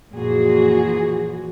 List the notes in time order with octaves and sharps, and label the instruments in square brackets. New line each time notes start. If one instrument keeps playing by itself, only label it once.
[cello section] F#2 A#2 E3 F3 F#4 G#4